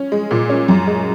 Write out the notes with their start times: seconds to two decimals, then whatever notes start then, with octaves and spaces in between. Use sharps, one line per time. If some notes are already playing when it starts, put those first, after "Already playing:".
Already playing: C#4
0.12 G#3
0.31 A#2
0.50 C#4
0.68 F#2
0.87 G#3